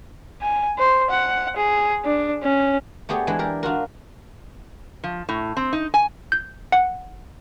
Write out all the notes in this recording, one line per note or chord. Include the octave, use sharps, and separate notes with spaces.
G#5
C5
F#5
G#4
D4
C#4
A3 B3 G4 G#4 C#5 D5
E3 G#3 D4 E4
G4 A#4 D5
D4 F4 F#4 A#4
F3
A2
C4
D#4
G#5
G6
F#5